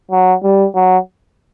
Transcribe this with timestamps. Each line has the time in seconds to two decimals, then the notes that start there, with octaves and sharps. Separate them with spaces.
0.11 F#3
0.43 G3
0.75 F#3